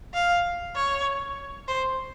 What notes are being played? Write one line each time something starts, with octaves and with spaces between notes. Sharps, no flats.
F5
C#5
C5